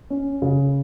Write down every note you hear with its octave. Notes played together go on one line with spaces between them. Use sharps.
C#4
C#3